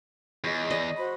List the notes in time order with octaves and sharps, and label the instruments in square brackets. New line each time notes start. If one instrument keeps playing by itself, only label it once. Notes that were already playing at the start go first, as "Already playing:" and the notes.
[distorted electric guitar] E2 [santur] G#3 F4 C#5
[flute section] D5 [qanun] D#5
[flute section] F#4 C5 B5